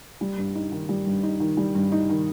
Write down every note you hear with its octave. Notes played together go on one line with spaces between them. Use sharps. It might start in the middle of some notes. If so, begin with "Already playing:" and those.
G3
G2
D#4
D#3
G3
G2
D#4
D#3
G3
G2
D#4
D#3